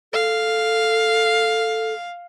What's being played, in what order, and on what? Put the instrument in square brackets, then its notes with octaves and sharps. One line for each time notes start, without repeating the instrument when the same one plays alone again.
[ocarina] A4 [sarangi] F5